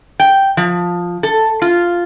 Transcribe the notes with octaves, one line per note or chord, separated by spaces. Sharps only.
G5
F3
A4
F4